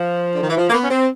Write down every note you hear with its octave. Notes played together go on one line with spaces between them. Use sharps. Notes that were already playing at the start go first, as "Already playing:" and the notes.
Already playing: F3
D3
D#3
E3
F3
A#3
B3
C#4
C4